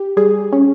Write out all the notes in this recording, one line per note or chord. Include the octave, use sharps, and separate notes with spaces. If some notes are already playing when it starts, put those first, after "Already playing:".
Already playing: G4
G3 G#4
C#4